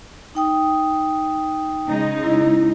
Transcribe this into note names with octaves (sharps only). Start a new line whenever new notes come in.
D#4 G5 D#6
C#3 G#3 D#4
E4